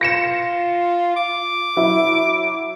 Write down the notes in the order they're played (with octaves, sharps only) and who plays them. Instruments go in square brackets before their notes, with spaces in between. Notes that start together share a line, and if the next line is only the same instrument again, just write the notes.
[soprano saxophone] F4 [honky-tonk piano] A#6 C#7 E7
[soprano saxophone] D6
[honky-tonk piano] F#3 E4